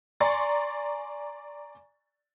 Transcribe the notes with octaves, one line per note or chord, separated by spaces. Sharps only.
D5 G#5 A#5 C6 C#6 A6